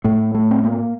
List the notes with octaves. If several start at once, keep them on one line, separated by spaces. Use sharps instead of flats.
A2 A3
A3
C4
A#3